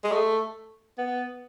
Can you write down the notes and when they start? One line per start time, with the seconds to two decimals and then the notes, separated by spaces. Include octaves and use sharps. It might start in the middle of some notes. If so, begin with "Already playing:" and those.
0.04 G#3
0.12 A3
0.98 B3